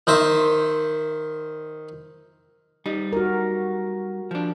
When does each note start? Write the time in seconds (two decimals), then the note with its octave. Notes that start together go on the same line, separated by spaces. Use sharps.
0.07 D#3 C5 E5
2.86 G3 D#4
3.13 F#4 A#4
4.31 F3 D4